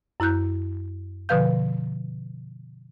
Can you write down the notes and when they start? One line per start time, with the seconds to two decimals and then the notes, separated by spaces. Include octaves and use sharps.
0.20 F#2 E4 A#5 F#6 G6
1.29 B2 D3 F3 B4 F5 G6